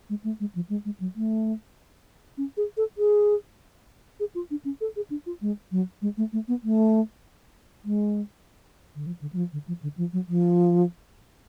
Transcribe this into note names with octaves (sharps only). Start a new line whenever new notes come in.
G#3
A3
G#3
F3
G#3
G#3
F#3
A3
C#4
G#4
A4
G#4
G#4
F4
D4
C#4
A4
G#4
D4
F4
G#3
F#3
G#3
A3
A3
B3
A3
G#3
D3
F3
D3
F#3
F3
D3
F3
D3
F3
F#3
F3